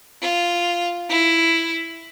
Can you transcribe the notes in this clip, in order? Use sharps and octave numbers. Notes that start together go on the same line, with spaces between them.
F4
E4